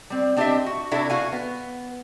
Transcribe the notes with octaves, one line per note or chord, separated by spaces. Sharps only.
G3 C4
C4 D4 G4 C#5 D#5 E5
F#4
C3 D4 E4 F#4 A4 E5
F#4 F5 G#5
B3